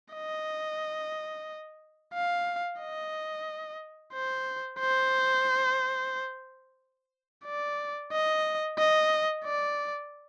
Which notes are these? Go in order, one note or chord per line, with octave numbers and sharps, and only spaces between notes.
D#5
F5
D#5
C5
C5
D5
D#5
D#5
D5